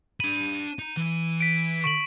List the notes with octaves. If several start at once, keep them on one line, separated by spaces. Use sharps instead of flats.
D4 B5 D#7
D#4
E3
B6 D7
C#6 D7 F#7